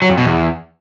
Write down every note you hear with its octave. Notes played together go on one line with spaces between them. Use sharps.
F#3
F2
B2
E2